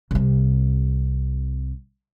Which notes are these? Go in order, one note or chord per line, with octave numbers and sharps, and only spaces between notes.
C2 C3